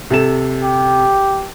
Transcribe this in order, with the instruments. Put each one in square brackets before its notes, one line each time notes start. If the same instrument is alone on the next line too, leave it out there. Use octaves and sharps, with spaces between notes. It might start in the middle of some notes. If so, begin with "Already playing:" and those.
[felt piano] C3 A4 E7
[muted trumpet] G4